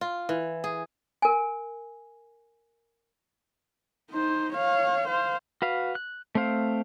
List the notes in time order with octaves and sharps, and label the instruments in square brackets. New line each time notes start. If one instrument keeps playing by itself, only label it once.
[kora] F4
E3
G#4
[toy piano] A#4 G#5
[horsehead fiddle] D#4 C5
C#5 F5
C5 F5
[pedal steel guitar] F#4 B4 F5
F#6
A3 C4 C5 F5